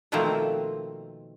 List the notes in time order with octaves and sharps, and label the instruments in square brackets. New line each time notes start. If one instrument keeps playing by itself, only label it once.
[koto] B2 D#3 F3 A3 A#3 C4